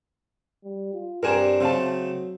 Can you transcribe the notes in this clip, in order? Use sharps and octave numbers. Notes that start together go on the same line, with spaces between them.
G3
F4
G2 C4 D4 G4 A#4 G#5 A#5
C#3 F#3 A3 C4 F5 A5